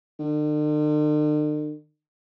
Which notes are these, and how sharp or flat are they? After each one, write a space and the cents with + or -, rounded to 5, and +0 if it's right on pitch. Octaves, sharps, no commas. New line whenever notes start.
D3 +45